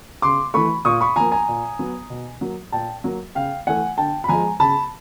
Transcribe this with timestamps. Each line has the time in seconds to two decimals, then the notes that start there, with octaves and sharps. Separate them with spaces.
0.22 C#3 C6 D6
0.54 E3 A3 B5 C#6
0.85 A#2 C#6 D#6
1.01 B5 C#6
1.16 F3 A#3 G#5 A#5
1.32 G#5 A#5
1.48 A#2
1.79 F#3 B3
2.10 B2
2.41 F#3 A#3
2.72 A#2 G5 A5
3.04 F#3 A#3
3.35 C#3 F5 G5
3.67 E3 A3 F#5 G#5
3.98 D3 G5 A5
4.24 B5
4.28 F3 G#3 G#5 A#5
4.60 C#3 A5 B5